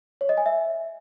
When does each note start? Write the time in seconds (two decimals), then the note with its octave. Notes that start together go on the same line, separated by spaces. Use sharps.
0.21 C#5
0.29 D#5
0.37 G#5
0.46 E5